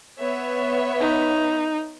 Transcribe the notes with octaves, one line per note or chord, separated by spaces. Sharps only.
B3 C#5 E5
D#4